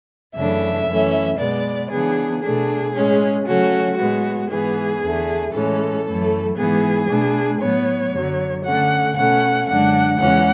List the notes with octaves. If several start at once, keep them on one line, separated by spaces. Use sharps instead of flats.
F#2 C#3 E3 A3 D4 E5
F#2 E3 A3 C#4
B2 G#3 B3 D5
C#3 E3 B3 D4 G#4
B2 A3 D4 G#4
A2 G#3 C#4
C#3 F#3 A3 C#4 F#4
A2 G#3 B3 F#4
G#2 E3 B3 G#4
E2 D3 A3
A2 E3 G#3 C#4 A4
F#2 E3 A3
G#2 E3 B3 G#4
B2 A3 D4
A2 F#3 B3 C#5
F#2 D3 F#3
D3 A3 C#4 F#5
B2 A3 C#4 F#5
F#2 D3 G#3 D4 F#5
E2 C#3 E3 G#3 C#4 F#5